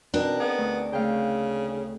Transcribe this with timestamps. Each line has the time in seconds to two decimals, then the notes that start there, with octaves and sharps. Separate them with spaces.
0.14 B2 C4 D4 D#4 A#4
0.40 B3 G#4 D#5
0.58 D2
0.93 C#3 A3 F5 G5